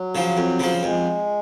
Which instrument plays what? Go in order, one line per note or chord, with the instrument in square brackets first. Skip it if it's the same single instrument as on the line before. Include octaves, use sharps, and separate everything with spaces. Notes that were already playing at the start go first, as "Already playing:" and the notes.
Already playing: [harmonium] F#3
[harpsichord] C#3 F3
F2
C#3 F3
[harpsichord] F2 [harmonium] G#3